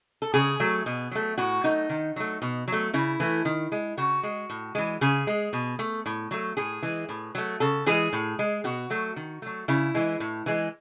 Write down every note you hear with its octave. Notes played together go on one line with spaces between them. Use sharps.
A4
C#3 G#4
F#3 A3
B2
F#3 A3
A2 F#4
F#3 A3 D#4
D#3
F#3 A3
B2
F#3 A3
C#3 E4
E3 A3
D#3
G#3
C#3 F#4
G#3
A2
E3 G#3
C#3 G#4
G#3
B2
A3
A2
F#3 A3
A2 G#4
E3 G#3
A2
F#3 A3
C#3 A4
E3 G#3 G#4
A2
G#3
B2 F#4
F#3 A3
D#3
F#3 A3
C#3 E4
E3 G#3
A2
E3 G#3